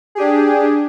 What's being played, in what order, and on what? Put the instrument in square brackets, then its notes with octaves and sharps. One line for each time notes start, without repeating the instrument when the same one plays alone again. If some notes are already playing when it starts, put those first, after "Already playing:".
[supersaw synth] D4 G4 G#4